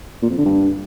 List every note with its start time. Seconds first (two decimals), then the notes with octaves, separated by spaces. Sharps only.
0.22 A#2
0.30 F2
0.38 D3
0.45 G2